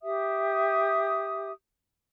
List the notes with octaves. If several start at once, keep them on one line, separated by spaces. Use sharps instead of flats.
G4 E5 D#6